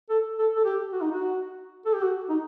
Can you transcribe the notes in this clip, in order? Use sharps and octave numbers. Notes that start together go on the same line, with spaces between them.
A4
A4
A4
G4
F#4
D#4
F#4
A4
G4
F#4
D#4